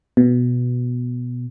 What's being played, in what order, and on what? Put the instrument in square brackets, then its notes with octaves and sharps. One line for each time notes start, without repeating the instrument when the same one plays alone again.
[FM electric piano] B2